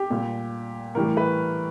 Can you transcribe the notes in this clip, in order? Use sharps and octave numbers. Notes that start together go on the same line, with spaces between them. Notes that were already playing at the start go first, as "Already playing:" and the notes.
Already playing: G4
A#2 G3
A2 E3 G3 A#4
B4